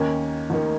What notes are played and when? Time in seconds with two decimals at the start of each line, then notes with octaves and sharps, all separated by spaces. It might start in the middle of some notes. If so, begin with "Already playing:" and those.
Already playing: D#2 D#3 A#3 C#4
0.50 D#2 D#3 A#3